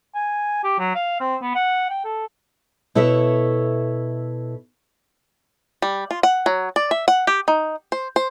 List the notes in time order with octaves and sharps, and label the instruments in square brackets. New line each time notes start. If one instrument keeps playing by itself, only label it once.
[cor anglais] G#5
G4
F#3
F5
C4
B3
F#5
G5
A4
[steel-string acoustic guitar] B2 E4 A4 C#5 E5
[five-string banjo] G3
F4
F#5
F#3
D5
E5
F#5
G4
D#4
C5
C5